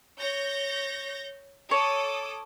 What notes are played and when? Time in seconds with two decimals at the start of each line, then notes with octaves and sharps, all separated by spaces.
0.20 C#5 G6 A#6
1.71 A4 C#5 D6 D#6